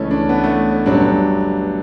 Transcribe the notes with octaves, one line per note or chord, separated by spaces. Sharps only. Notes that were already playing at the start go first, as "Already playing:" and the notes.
Already playing: C#2 C#3 E3 A3 C#4
D4
B3
A3
C#4
G1 G2 F#3 D4